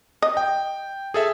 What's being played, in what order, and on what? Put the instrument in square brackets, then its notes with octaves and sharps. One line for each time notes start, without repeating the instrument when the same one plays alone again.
[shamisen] D#5
[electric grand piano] G5
G#4 A4 E5